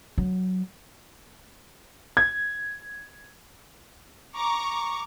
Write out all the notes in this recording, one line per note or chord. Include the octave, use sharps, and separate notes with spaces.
F#3
G#6
A#5 C#6 D6